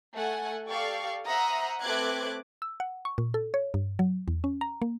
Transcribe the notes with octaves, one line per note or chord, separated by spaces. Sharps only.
A3 F#5 G#5
G4 A4 D5 F5 C#6
C5 E5 F#5 A#5 D#6
A3 C4 B4 D6 F#6 G#6
E6
F#5
C#6
A#2
A4
C#5
G2
F#3
E2
C#4
A#5
A#3